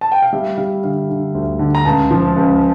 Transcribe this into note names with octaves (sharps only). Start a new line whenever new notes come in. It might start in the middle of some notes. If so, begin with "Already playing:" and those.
A5
G5
F5
G3 E5
G3 F5
D3 F5
D3
D2
D3
A#5
C#2 A5
F3
C#2